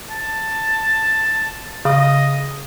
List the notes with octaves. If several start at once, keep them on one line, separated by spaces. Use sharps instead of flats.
A5
C#3 D#5